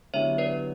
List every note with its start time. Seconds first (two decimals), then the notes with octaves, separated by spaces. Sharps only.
0.14 D3 F#3 B3 E4 G4 C#5 E5
0.38 B4 D5